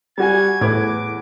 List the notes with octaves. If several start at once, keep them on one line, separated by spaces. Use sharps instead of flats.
G3 F#4 G#5 G#6
E2 A2 B4 D6 G#6